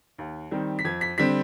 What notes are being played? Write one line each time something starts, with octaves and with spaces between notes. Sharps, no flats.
D#2
D#3 G3 C4
B6
F2 G#6
B6
D3 G3 C4 B6